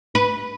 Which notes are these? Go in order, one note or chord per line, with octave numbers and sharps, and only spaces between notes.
B4